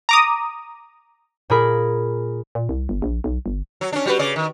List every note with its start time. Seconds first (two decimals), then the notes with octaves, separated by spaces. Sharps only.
0.09 A#5 D6 D#6
1.50 A#2 G#4 A#4 B5
2.55 A#2
2.69 C2
2.89 G1
3.02 A#1
3.24 B1
3.46 G1
3.81 F#3
3.93 C#4 D4
4.06 G3 F#4 B4
4.19 C#3 D5
4.36 D#3